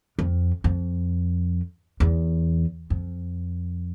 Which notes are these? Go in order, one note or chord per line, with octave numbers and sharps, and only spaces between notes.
F2
F2
E2
F2